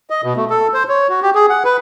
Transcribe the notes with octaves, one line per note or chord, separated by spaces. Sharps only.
D#5
B2
A3
A4
C5
C#5
F#4
G4
G#4
F#5
B4